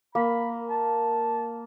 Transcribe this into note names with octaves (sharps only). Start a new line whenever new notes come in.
A#3 B5
A5